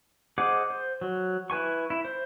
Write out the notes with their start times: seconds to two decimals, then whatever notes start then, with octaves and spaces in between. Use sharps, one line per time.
0.38 G#4 C5 D#5 F#5 D6
0.70 C5
1.01 F#3
1.50 E4 B4 G#5 C#6
1.90 E4
2.05 C5